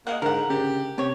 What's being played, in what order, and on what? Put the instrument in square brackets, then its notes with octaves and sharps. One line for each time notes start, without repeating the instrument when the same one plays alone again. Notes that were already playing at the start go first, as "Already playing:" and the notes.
[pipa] G#3 F5 F#5 [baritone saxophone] A#3
[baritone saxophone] G#2 [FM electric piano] D3 [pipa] A#4 F#5
[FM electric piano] C#3 [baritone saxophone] G4
[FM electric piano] C3 [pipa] G4 C#5